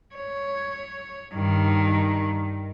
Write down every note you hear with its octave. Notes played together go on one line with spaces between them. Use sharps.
C#5
G2 D#3